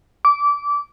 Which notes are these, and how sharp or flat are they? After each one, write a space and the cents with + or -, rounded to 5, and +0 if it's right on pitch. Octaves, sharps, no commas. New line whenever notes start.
D6 -20